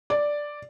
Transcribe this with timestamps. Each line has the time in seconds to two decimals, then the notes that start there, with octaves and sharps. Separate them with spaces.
0.10 D5